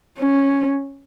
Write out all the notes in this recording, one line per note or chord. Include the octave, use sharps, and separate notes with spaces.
C#4